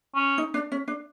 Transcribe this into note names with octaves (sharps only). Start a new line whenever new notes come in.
C#4
D#4
D4
C#4
D4